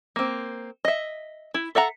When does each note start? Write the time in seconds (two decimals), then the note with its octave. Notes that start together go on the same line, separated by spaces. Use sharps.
0.16 A#3 C4
0.85 D#5 E5
1.54 E4
1.75 A4 E5 F#5 A#5